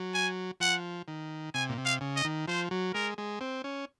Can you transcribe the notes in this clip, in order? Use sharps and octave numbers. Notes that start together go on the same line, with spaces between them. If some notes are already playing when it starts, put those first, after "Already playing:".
Already playing: F#3
G#5
F3 F#5
D#3
C3 G#5
A#2
C3
F5
C#3
D#5
D#3
F3 C5
F#3
G#3 A#4
G#3
C4
C#4